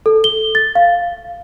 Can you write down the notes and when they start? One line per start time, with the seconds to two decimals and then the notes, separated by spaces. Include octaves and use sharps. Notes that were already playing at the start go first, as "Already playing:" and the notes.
0.06 A4
0.24 G7
0.55 A6
0.75 F5